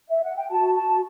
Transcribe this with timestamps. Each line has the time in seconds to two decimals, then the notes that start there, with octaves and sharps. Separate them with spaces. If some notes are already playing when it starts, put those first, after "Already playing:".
0.09 E5
0.23 F#5
0.36 G5
0.50 F#4 A5
0.74 A5